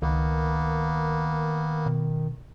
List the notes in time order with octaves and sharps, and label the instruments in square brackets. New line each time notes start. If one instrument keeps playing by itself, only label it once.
[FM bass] C#2 [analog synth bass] D#3 [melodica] A#3 B3
[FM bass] B2